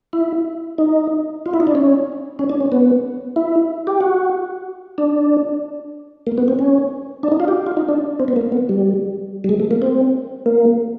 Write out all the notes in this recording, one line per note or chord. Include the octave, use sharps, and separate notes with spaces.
E4
D#4
F4
E4
D#4
D4
C#4
C#4
D4
C#4
B3
E4
G4
F#4
D4
A#3
B3
C4
C#4
D4
D#4
F4
G4
F4
D#4
D4
C4
B3
A#3
B3
G3
G3
G#3
A3
A#3
C4
A#3